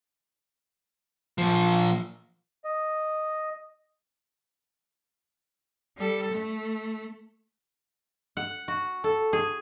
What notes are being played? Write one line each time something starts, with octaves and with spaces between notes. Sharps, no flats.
A#2 F3
D#5
G3 A4
A3
F#5
F#4
A4
G#4